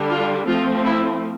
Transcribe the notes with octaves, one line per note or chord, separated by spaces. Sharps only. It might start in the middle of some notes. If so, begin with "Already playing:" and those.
Already playing: D3 G3 D4
F4
F3 A3 C4 F4
E4